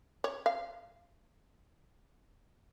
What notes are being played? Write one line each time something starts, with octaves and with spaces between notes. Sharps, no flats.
C#5
F5